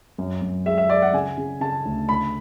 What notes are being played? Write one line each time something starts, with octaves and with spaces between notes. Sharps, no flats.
F#2
F#2
G#3 E5
E5
G#3 D5
F#5
C#3 G#5
C#3
C#3 A5
D2
D2 B5